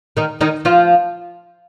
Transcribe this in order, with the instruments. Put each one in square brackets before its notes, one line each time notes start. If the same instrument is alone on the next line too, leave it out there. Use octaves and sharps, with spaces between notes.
[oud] D#3 D#4
D#3 D#4
F3 F4